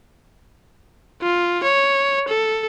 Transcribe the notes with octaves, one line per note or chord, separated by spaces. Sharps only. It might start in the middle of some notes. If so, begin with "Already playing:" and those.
F4
C#5
A4